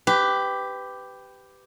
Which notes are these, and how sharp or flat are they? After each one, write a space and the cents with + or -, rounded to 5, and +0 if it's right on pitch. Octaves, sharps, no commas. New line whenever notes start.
G4 +0 B4 +20